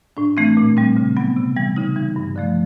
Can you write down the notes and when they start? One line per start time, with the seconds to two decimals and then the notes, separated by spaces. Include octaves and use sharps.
0.17 A2 D4
0.37 E3 A3 C4
0.57 A#2
0.77 G3 C4
0.97 C#3
1.17 F#3 B3
1.36 C3
1.56 E3 G3
1.76 C#3 D#4
1.96 E3 G3
2.16 G2
2.36 D3 F3 A3